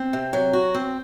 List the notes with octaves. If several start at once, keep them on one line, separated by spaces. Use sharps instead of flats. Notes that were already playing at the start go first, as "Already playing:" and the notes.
Already playing: C4
C3
F#3
F#4
C4